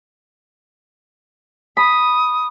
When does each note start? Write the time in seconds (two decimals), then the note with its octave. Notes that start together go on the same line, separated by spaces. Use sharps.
1.77 B5 D#6